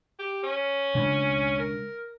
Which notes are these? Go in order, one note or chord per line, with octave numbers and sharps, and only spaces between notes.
G4
C#4
C#3 G#3 D4
A#4